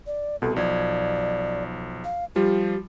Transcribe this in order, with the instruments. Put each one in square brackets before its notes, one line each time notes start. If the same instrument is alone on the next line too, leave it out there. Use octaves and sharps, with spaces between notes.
[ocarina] D5
[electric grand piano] C2 B2 [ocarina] A4
[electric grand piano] B1 F3 G#6 [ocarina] D5
[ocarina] F5
[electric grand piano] F3 G3 F4 [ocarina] G4